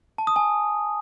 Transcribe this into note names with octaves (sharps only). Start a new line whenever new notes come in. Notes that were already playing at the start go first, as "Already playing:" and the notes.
A5
D#6
G#5